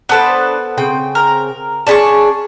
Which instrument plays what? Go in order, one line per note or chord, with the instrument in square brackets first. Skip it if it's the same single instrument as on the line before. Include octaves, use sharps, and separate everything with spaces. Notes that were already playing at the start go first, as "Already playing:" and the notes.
[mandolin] B3 A4 B4 [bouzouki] D4 C5
[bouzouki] C#3 C4 G5
[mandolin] A#4
[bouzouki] C#4 D4 G#4 [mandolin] A5 B5 C#6